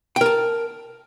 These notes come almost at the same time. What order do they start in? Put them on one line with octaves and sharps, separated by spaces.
G5 A#4 A5